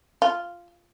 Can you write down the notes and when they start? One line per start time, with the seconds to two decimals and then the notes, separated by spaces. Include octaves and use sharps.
0.22 F4